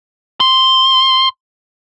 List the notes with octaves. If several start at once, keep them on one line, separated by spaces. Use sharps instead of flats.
C6